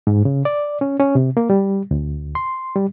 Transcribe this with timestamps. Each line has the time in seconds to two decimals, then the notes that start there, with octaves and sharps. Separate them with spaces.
0.07 G#2
0.25 C#3
0.45 D5
0.81 C#4
1.00 C#4
1.15 C3
1.37 A#3
1.50 G3
1.91 D2
2.35 C6
2.75 G3